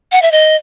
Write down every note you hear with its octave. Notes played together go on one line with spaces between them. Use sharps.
F#5
E5
D#5